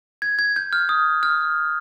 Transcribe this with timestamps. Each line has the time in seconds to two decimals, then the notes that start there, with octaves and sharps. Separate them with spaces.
0.22 G#6
0.39 G#6
0.56 G6
0.73 F6
0.89 D#6
1.23 F6